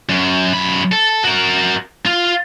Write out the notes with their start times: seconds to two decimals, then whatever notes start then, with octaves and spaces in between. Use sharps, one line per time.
0.09 F#2
0.53 F#2 B5
0.92 A4
1.24 F#4 A#4
2.06 F4